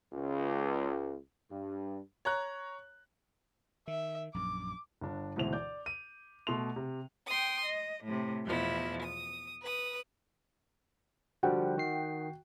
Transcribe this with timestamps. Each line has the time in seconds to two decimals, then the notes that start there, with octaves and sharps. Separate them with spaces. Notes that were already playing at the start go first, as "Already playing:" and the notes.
0.12 C#2
1.50 G2
2.25 C#5 A#5 F#6
3.88 D#3 E5
4.34 A#1 F#2 D6
5.01 G1 D4
5.36 D2 G#2 B2 E3 C5 F7
5.53 D5 D6 G6
5.86 D#7
6.47 B2 A3 C6 F7
6.76 C3
7.27 G5 C6 D#6
7.66 D#5
8.04 A2 C3
8.45 E2 B2 F3 E4
9.03 D#6
9.62 B4 D#6
11.43 D3 F3 G3 F#4 F#5 G5
11.78 D#3 C7